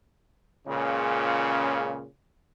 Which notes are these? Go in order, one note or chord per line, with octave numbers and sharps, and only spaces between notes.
C#2 A#2 C#3